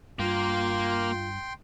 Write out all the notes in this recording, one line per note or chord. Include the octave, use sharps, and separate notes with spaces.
G2 A#3 F4 G5 C6